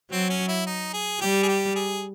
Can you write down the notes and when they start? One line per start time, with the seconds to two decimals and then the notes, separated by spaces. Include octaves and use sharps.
0.11 F#3 C4
0.30 C#4
0.48 E4
0.66 D#4
0.93 G#4
1.20 G3 G4
1.43 G#4
1.48 G4
1.75 G#4